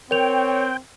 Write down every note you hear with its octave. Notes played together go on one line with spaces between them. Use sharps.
C4 A#4 C#5 G5 F7